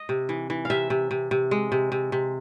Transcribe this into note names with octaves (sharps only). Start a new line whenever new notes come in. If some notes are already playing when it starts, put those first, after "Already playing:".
Already playing: D#5
C3
E3
E3
C3 E5 F5
C3
C3
C3
G#3
C3
C3
C3